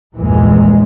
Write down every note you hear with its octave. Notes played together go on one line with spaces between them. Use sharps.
A#1 E2 G2 A#2 E3 G#3